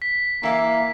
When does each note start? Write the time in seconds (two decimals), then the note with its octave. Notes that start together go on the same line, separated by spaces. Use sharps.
0.02 B6
0.43 E3 A#3 E5 F5